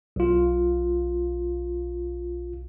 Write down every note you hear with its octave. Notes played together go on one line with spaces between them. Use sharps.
B1 F4